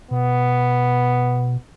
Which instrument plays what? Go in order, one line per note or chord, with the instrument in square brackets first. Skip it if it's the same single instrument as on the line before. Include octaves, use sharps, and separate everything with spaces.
[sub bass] B2 [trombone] B3